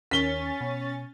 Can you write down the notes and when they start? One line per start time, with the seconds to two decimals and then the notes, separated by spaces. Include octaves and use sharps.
0.11 D#2 D#3 C#4 A#4 A6 B6 G7
0.61 B2